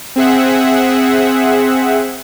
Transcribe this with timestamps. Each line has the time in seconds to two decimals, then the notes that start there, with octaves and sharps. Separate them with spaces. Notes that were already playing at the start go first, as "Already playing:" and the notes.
0.16 C4 G#4 E5 F#5